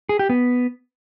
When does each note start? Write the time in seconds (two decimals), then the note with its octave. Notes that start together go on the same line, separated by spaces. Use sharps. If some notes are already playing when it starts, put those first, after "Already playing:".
0.09 G#4
0.19 G4
0.29 B3